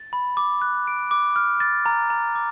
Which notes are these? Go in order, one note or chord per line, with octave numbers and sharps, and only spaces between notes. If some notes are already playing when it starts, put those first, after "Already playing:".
Already playing: A6
B5
D6
F#6
D7
D6
F6
A6
A#5
A#5
D6